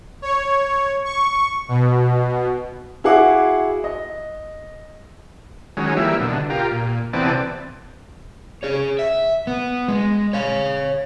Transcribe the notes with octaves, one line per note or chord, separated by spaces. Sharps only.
C#5
C#6
B2
E4 F#4 G#4 F5 F#5 D6
D#5
D#3 F#3 G#3 C#4
E3 G3 A#3 E5
B2 D3
F4 G4 A#4
A#2
C3 E3 B3 C4 D5 A5
G#4 C#5
E5
B3
G#3
C#5 F5